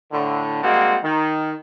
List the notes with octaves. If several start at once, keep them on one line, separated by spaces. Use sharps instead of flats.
A2 D3
G3 G#3 A#3 C4 F#4
D#3